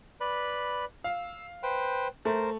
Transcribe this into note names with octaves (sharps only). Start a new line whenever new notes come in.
B4 D5 B5
F5 E6
B4 C5 G5
A3 A#4 C5